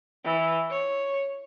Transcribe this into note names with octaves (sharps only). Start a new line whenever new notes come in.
E3
C#5